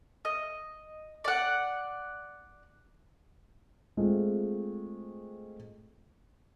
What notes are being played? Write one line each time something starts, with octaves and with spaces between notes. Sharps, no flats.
D#5
D5 F#5
G#3 A3 C4 F4